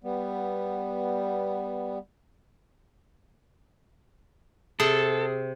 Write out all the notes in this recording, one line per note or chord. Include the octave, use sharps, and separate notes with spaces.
G3 B3
C3 G#4 A4